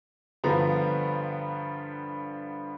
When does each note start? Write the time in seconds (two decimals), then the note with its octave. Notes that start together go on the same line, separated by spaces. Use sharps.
0.44 G2 D3 F3 B3 A#5